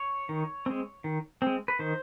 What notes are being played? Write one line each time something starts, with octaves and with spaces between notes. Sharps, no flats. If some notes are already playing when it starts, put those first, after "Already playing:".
Already playing: C#5
D#3
G#3 C4
D#3
G#3 C4
B4
D#3 C5